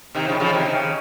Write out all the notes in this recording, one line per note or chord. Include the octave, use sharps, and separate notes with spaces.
C3 D#3
C#3 F3
C#3 F3
C3 D#3
C#3